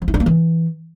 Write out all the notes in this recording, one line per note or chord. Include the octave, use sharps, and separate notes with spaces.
F3
E4
D4
A#3
E3